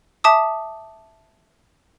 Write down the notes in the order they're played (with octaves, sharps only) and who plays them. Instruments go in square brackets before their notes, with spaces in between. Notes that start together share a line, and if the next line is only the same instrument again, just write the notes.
[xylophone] E5 A5 D6 D#6